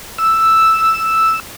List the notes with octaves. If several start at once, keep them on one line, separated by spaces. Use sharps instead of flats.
E6